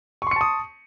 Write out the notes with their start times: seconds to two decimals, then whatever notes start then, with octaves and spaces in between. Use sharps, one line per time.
0.22 C#6
0.27 C6
0.31 C#7
0.36 A5
0.41 D#6